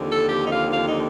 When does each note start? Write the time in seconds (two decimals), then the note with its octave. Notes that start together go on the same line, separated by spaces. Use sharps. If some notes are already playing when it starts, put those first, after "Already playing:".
Already playing: D#2 D3 F3 C4
0.09 A4
0.29 G4
0.46 D#4
0.51 F4
0.72 F4
0.87 D#4